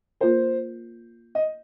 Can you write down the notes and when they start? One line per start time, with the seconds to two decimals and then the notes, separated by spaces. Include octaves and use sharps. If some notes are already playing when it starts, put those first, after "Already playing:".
0.21 A#3 F4 A#4 C5
1.35 D#5